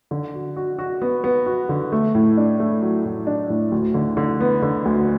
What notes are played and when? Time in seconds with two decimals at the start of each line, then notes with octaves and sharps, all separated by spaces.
0.11 D3
0.34 F#4
0.56 F#4
0.79 F#4
1.02 B3
1.24 B3
1.46 F#4
1.69 D3
1.92 A3
2.15 A2
2.37 D4
2.60 A3
2.82 F#3
3.05 A2
3.27 D4
3.50 A2
3.72 D2
3.94 D3
4.17 D3
4.41 B3
4.62 D3
4.85 D2